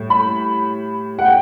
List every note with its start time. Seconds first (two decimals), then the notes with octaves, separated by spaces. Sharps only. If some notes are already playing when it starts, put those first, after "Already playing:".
Already playing: A2 G3
0.10 B5
1.19 F#5
1.24 G5